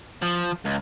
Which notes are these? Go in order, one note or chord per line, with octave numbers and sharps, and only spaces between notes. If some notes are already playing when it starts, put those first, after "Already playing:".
F3
C#2